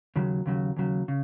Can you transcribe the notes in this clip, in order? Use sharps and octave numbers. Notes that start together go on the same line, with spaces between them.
D#2 C#3 F#3
D#2 C#3 F#3
D#2 C#3 F#3
C#3